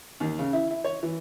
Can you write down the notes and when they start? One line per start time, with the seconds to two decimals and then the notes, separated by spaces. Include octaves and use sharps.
0.20 D#2
0.39 C#3
0.53 E4
0.71 E4
0.84 C#5
1.03 E3